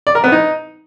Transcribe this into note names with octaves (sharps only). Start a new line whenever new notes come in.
D5
A#4
B3
D#4